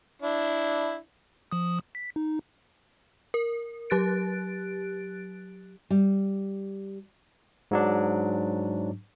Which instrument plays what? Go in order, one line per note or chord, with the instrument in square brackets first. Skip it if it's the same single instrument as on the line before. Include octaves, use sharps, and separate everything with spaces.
[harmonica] D4 E4
[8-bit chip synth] F3 D#6
B6
D#4
[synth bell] A#4
F#3 G4 F#6 A6 D7
[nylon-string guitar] G3
[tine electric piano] G#2 F#3 D4